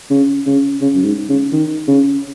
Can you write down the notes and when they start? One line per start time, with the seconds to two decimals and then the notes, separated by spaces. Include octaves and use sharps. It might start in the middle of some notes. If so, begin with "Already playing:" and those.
0.10 C#3
0.46 C#3
0.81 C#3
0.95 F#2
1.04 G#2
1.29 C#3
1.52 D#3
1.88 C#3